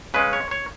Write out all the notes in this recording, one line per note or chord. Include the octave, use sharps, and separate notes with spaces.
C#3 G#3 C#4 B4
C#5
C#5